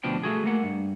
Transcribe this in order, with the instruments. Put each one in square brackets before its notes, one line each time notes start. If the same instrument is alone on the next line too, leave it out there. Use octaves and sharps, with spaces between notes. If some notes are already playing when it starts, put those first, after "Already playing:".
[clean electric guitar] D2 B2 F3 D4 G5
A3 F#4 G#4
A3 A#3 F#5
G2